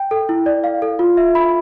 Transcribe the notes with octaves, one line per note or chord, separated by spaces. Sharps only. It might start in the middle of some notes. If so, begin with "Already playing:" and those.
Already playing: G5
A4
E4
D5
F5
A4
F4
E5
B5